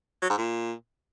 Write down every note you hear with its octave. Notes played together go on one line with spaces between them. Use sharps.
F#3
G#2
A#2